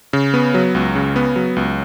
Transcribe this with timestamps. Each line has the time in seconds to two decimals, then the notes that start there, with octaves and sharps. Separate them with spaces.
0.13 C#3
0.34 B3
0.54 F#3
0.75 C#2
0.96 C#3
1.16 B3
1.36 F#3
1.56 C#2